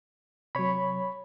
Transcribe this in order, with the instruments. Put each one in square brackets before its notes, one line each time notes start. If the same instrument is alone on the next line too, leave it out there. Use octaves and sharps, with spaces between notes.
[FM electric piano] C3 F#3 [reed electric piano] C#5 B5